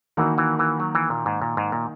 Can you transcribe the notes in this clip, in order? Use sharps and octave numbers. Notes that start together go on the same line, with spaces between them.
D#3 E3 A#3 D#4 F#4
E3
E3
F#3
E3
A#2
G#2
A#2
G#2
A#2